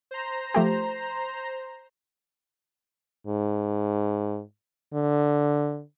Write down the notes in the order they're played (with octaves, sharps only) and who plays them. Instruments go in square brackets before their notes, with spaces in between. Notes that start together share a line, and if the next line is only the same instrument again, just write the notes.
[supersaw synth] C5 A#5
[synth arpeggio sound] F3 A3 G4
[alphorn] G#2
D3